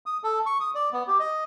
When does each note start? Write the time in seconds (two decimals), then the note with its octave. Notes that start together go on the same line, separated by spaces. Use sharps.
0.06 D#6
0.23 A4
0.46 C#6
0.60 D#6
0.75 D5
0.92 B3
1.07 G4
1.19 D#5